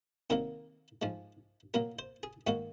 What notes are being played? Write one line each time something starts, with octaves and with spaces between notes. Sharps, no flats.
C3 D#3 F#3 A#3 A#4
G#2 F3 G#3
A#2 F#3 A#3 A#4
C5
G#4
G#2 D#3 A#3 F#4